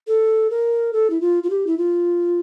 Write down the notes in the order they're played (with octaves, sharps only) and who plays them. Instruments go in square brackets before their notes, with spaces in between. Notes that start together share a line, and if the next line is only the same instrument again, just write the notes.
[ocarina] A4
A#4
A4
E4
F4
F4
G4
E4
F4